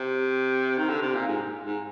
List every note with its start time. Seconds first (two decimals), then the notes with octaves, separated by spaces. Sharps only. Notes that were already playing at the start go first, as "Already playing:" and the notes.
Already playing: C3
0.78 D#3
0.90 D3
1.02 C3
1.15 A#2
1.27 G#2
1.66 G#2